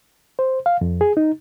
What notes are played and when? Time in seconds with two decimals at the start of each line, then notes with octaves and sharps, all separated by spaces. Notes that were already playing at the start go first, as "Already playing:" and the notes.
0.39 C5
0.66 F5
0.81 F2
1.01 G#4
1.17 D#4